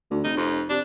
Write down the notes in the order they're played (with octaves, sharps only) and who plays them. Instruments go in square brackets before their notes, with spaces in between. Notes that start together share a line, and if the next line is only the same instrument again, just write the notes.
[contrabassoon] D2
[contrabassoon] F1 [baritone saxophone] D#4
[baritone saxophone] F2
[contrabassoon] C3 [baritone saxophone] D4